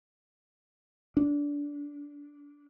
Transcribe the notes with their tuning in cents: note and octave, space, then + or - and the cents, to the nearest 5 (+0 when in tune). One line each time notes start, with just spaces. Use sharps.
D4 -20